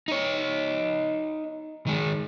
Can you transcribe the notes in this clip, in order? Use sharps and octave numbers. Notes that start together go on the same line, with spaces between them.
D#4 C#5
D#3 G#3